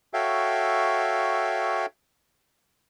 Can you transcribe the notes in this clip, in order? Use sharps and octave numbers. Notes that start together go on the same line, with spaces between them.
F#4 A4 C#5 E5 F5 G5